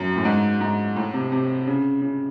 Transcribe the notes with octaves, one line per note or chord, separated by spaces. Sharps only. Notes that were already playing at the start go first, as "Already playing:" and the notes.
Already playing: F#2
A2
G#2
G#2
A2
C3
C3
C#3
C#3